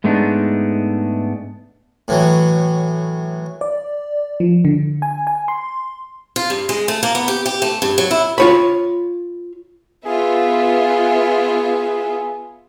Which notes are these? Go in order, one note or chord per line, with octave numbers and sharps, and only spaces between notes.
G#2 G#3 A3 B3 D4 D#4
A2 E3 F#3
D5
F3
D3
G#5
G#5
C6
F4
G2
G#3
A3
A#3
B3
G4
G4
A3
G2
F#3
E4
F4 C#5 B5
B3 F4 G#4 E5